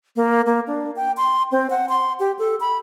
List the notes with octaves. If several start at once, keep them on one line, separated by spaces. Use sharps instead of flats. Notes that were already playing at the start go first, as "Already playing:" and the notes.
A#3
A#3
D4
G5
C6
C4
F#5
C6
G4
A4
B5